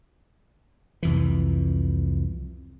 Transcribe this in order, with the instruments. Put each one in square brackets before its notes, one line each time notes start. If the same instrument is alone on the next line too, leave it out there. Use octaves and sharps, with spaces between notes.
[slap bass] C2 F2 E3